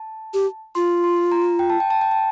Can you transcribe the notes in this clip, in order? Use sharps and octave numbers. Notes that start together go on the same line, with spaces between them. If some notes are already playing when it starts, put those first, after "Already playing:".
Already playing: A5
G4
F4 C6
C6
A#5
G5
A5
G5
A5
G5
A5